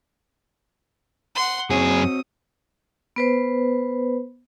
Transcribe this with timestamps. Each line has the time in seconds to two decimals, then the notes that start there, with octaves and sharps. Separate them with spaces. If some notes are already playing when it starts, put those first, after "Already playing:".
1.35 F#5 C6
1.70 F#2 C4 F#4 G#4 C#5 D#6
3.16 B3 B4 C5